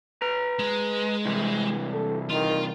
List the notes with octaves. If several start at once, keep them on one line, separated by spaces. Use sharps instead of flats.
B4 A#5
G#3
C3 E3 G3
A4
D#3 F4